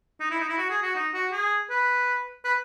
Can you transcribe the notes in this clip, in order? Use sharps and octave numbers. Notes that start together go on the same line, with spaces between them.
D#4
E4
D#4
E4
F#4
G#4
F#4
D#4
F#4
G#4
B4
B4